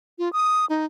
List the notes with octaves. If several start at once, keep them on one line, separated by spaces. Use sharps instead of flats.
F4
D#6
D#4